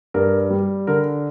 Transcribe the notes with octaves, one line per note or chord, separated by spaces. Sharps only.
G2 A#4
G3
D3 A#4